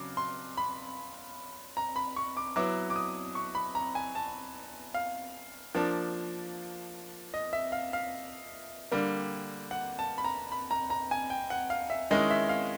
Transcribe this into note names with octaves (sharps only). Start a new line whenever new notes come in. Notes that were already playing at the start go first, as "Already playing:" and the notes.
Already playing: C#3 F#3 D6
C6
B5
A#5
B5
C#6
D6
F#3 B3 E4 D6
D6
D#6
C#6
B5
A#5
G#5
A5
F5
F3 A#3 D4
D#5
E5
F5
F5
D3 G3 A#3
F#5
A5
B5
A#5
B5
A#5
A#5
G#5
G5
F#5
F5
E5
D#3 G#3 C#4 E4 D#5
E5
F5